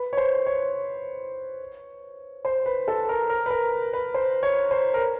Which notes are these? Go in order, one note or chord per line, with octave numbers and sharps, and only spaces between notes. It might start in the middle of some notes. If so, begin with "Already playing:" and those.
Already playing: B4
C#5
C5
C#5
C5
B4
A4
A#4
A#4
B4
A#4
B4
C5
C#5
C5
A#4
B4